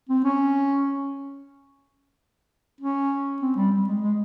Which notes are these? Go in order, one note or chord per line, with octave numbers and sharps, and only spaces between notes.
C4
C#4
C#4
C4
G3
G3
G#3
G#3